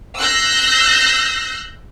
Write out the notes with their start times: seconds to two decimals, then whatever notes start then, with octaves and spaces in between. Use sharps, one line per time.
0.17 E6 F#6 G6 A#6 C7